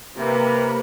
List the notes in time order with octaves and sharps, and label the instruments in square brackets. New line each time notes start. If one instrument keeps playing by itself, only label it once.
[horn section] C3 [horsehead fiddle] A#3 B4